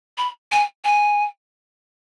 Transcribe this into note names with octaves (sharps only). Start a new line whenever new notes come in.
B5
G#5
G#5